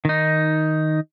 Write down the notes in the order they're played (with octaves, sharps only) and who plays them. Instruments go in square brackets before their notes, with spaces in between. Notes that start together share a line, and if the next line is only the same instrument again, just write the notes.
[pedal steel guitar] D#3 D#4